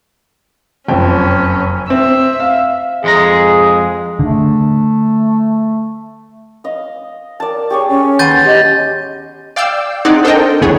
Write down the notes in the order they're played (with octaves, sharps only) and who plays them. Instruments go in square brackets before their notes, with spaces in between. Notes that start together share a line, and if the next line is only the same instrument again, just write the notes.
[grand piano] F#1 F2 G5 [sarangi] C#4
[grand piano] C4 [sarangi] E5
[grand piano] F5
[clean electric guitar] F2 G#3 A#5 [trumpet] G#4
[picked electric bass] D3 [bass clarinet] A3
[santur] D#5 F5
[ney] A#4 [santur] D5 A5
[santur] G4 G#4 C#5 [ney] C#6
[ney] C#4
[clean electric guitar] D#2 C6 [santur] B3 [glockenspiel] G6 A6 D#7
[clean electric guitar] G4 D#5
[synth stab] D5 F5 G5 D6 E6 C7
C4 D#4 G#4 D5 F#5
D4 A4 A#4 C5 D#5 G5
A#1 E2 D3 B3 G#4 C#5